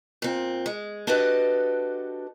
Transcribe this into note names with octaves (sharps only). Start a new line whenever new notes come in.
A#2 C4
G#3
D4 F#4 G4 A4 B4 D#5